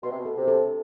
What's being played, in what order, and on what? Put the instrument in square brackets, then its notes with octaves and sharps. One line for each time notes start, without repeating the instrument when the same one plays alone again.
[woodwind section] B2 [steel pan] C6
[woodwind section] C3
B2
[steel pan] A4
[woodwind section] C3
[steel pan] A4